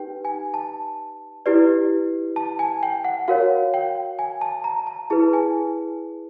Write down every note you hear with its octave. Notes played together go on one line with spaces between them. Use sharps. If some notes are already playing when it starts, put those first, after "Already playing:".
Already playing: D#4 G4 B4 G5
G#5
A5
E4 G4 B4 D5
A5
G#5
G5
F#5
F#4 A#4 C#5 F5
G5
G#5
A5
A#5
A5
E4 G#4 B4 A5
G#5